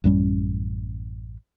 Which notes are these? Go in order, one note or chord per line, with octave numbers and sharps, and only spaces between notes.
A1 F#2 G3 C#4